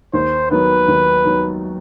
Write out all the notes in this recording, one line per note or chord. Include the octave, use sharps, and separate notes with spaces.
D#2 C5
D#3 F#3 B3 B4
D#2
D#3 F#3 B3